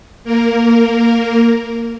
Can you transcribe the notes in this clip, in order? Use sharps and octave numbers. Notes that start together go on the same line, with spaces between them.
A#3 A#4